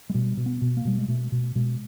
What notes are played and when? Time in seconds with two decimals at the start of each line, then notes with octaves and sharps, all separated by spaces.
0.10 G#3
0.14 B2 G3
0.37 B2
0.46 B3
0.62 B2
0.77 A#3
0.85 B2 G3
0.98 G#3
1.08 B2 A3
1.32 B2
1.55 B2 G#3